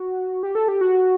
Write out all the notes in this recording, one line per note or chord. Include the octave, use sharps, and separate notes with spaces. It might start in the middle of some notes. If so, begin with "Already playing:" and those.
Already playing: F#4
G4
A4
G4
F#4